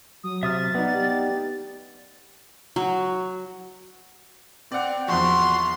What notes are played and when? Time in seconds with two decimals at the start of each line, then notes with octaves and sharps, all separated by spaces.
0.24 F#3 D#6
0.43 C3 E5 D#6 F6 A6
0.75 B3 D#4 D5
0.94 G4
2.76 F#3
4.72 C4 D5 F#5
5.08 E2 F3 F#4 C6